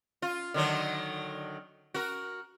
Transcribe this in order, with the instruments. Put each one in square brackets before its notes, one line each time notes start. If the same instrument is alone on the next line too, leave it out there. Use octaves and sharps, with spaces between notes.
[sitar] F4
D3 D#3 F#3
F#4 A#4